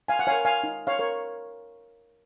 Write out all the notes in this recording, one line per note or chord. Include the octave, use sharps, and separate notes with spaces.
F5 G#5
F#5
A#4 C#5 F5 G#5
F5 G#5
D#4
C#5 F5
A#4 C#5